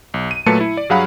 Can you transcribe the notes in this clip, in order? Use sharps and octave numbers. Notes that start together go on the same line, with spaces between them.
B1
D#7
A#2 F#3 A3 B4 A5 C#7
E4
D5
G2 F#3 G#4 F5 F#5 B5